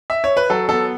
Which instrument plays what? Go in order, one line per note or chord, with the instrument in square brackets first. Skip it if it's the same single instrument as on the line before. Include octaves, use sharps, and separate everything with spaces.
[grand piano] E5
C#5
B4
F#3 A4
B3 A4